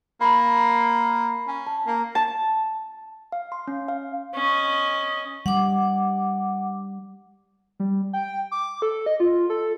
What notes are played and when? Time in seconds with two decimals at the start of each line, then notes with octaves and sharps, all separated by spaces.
0.21 A#3 A#5 B5
1.48 C#4
1.67 A5
1.87 A#3
2.15 A5
3.32 F5
3.52 C6
3.68 C#4
3.88 F5
4.34 C#4 D#5
5.46 G3 F#5 D6
7.80 G3
8.13 G5
8.52 D6
8.82 A4
9.06 D#5
9.20 F4
9.50 A4